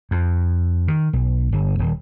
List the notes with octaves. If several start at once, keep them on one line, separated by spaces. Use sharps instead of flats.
F2
D#3
B1
G1
D#1